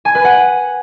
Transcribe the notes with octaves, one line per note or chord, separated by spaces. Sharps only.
G#5
B4
F#5